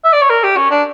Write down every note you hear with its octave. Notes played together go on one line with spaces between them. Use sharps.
E5
D5
C#5
A#4
G4
C#4
D4